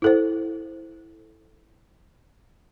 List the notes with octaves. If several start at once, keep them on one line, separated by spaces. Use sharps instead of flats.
E4 A4 C5